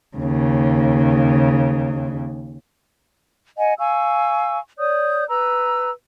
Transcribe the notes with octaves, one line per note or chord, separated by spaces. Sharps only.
D#2 C#3
D#5 F#5 G#5
F5 G#5 C#6 E6
C#5 D5 D#6 G6
B4 A#5 E6